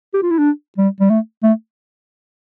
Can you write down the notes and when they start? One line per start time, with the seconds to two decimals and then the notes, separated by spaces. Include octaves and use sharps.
0.14 G4
0.23 F4
0.31 E4
0.39 D4
0.78 G3
1.00 G3
1.10 A3
1.43 A3